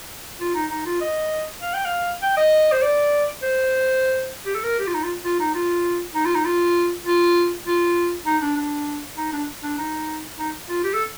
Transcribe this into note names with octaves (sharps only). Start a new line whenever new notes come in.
F4
D#4
D#4
F4
D#5
F5
G5
F5
G5
D#5
C5
D5
C5
G4
A4
A#4
G4
F4
D#4
F4
F4
D#4
F4
D#4
F4
D#4
F4
F4
F4
D#4
D4
D4
D#4
D4
D4
D#4
D#4
F4
G4
A4